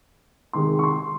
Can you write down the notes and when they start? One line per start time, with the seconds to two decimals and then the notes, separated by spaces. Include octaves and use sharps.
0.53 C3 D#3 G#3 C6
0.79 C#6
0.83 C6